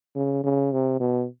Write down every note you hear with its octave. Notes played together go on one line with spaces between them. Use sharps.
C#3
C#3
C3
B2